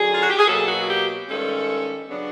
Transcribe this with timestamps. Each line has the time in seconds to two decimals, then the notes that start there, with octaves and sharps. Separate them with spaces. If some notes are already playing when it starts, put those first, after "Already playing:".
Already playing: F#2 D3 F#3 G#4
0.13 F4
0.22 F#4
0.30 G4
0.39 G#4
0.47 B2 F#3 A#3 A4
0.67 F#4
0.88 G4
1.28 G2 D#3 G#3 C#4 A4
2.10 C#3 F#3 B3 D4